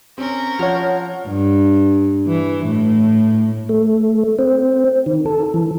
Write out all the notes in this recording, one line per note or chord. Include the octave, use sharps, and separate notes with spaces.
C4 C#4 A#4
F3 C#5 F#5 F6
G2
E3
A2
A3
C4
D#3
A4
E3